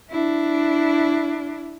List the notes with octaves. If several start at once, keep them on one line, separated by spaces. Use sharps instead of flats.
D4 E4